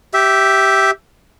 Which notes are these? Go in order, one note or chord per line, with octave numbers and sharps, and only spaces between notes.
G4 E5